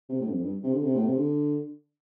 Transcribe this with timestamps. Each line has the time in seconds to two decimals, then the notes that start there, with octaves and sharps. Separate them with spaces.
0.09 C3
0.20 A2
0.27 G2
0.31 F2
0.42 G2
0.63 C3
0.73 D3
0.84 C3
0.95 A2
1.06 C3
1.17 D3